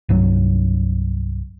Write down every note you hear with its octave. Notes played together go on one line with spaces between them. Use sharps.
C2 G2 F#3